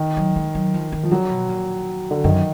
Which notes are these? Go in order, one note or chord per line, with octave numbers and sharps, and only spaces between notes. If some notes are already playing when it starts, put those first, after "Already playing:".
Already playing: D#3
F#3
G#3
F#3
F3
D#3
F3
D3 F#3
B2
A#2
D3
F#2 D#3